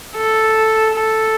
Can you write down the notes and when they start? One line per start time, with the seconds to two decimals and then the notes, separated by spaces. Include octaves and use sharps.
0.17 A4
0.95 A4